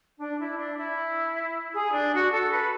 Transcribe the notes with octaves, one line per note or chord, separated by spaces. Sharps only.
D4
E4
D4
E4
G#4
D4
F#4
A4
B4